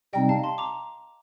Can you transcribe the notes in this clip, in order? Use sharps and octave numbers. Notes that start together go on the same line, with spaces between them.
C3 G3 C4 D#4 D#5 G5
F5 A5
A5 C6
A#5 D6